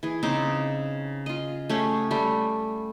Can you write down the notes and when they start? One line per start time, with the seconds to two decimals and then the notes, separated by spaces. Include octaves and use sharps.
0.03 E3 G#4
0.23 C#3 C4 D#4 D6
1.26 F4 D#5
1.70 A3 C#4 G4 G#4
2.11 G3 A3